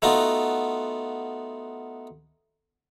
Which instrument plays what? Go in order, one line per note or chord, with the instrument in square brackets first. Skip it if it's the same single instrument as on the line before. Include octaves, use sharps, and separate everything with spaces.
[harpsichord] A3 B3 D#4 F4 F#4